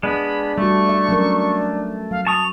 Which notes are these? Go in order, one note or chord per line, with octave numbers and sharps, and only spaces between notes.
G#3 B3 D4 B5
G3 A3 F#4 C#6
E5
F#3 C#4 A#4
F#3 F5
A5 C#6 D#6 F7